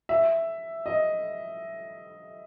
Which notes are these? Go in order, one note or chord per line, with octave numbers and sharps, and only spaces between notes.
E5
D#5